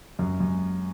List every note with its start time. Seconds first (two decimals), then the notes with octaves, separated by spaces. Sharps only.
0.19 F#2
0.40 F#2